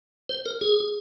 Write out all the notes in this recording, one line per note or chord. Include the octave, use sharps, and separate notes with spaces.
C5
A#4
G#4